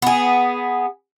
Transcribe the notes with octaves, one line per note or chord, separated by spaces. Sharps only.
B3 G#4